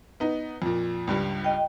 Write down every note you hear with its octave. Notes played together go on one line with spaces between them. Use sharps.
B3 D#4
F2 A#2
C#2 G2 G3
D#5 G5